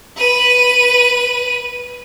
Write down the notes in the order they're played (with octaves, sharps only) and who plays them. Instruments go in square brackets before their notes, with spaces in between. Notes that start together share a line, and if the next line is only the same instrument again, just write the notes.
[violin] B4 D#7